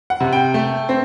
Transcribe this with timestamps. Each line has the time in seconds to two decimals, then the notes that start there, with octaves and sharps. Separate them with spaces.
0.10 F#5
0.20 C3
0.33 G5
0.54 A3
0.89 C4